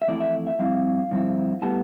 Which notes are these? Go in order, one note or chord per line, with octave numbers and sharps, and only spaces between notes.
E5
F2 E3 A3 E4 D5
E5
E5
G2 F3 C4 E4 F5
G2 D3 F3 C4 E4
A2 G3 B3 A5